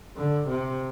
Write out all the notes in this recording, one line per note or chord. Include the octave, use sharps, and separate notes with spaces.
D3
C3